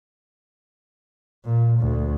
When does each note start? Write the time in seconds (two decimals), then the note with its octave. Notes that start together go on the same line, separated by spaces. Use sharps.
1.45 A#2
1.80 D2